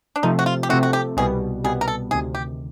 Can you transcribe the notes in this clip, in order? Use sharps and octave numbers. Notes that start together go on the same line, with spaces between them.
D4
C3 F3 A3 C4 D#4
F#4
F4
G4
C3 F3 A3 C4 F#4
F#4
G4
C2 B2 G3 B3 G#4
C2 B2 G3 B3 G#4
A#4
A4
D2 C3 D#3 G#4
G4